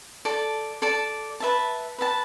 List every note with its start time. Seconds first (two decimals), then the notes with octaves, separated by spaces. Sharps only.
0.25 A4 D5 A5
0.82 A4 D5 A5
1.40 B4 E5 A5
1.98 B4 E5 A5